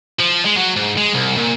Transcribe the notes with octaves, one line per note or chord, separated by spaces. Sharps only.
F3
G#3
F#3
G#2
G#3
C2
A#2